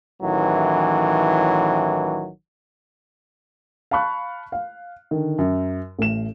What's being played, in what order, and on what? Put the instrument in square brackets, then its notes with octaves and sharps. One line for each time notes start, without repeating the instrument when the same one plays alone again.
[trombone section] A1 D#3 E3 F#3
[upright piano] F5 A5 B5 C#6 F#6
F5
D3 D#3
F#2
A1 A3 E7